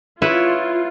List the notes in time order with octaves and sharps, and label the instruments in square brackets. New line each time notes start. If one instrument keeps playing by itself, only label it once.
[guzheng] E4 B4 C#5 [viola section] F4